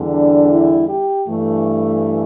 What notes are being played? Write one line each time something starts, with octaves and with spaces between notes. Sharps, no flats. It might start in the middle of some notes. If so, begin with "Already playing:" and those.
Already playing: E2 D3 G3
D4
E4
G4
G2 E3 A3